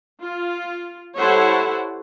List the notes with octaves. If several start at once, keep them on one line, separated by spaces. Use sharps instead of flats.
F4
G3 E4 A4 C5 C#5 F#5